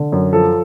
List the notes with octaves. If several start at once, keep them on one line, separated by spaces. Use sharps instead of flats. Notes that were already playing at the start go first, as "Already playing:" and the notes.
Already playing: D3
F#2
F3 A4